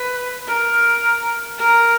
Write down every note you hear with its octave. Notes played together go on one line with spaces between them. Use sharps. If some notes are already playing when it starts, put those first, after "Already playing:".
Already playing: B4
A#4
A#4